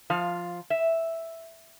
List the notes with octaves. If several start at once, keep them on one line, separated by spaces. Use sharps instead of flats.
F3 F4 F5
E5